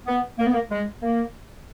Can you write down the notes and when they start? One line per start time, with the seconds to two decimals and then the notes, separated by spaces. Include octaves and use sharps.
0.07 B3
0.39 A#3
0.46 B3
0.53 A#3
0.70 G#3
1.02 A#3